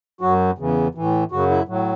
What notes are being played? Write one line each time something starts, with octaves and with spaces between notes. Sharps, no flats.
F#2 F#3 F#4
E2 C#3 E3
A2 E3
F#2 C#3 F#3 F#4
E4
A2 F#3